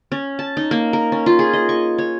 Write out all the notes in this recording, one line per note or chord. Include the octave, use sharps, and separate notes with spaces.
C#4
A5
D#4
A#3
A#4
C#4
F4
G#4
D#5
C#6
C#5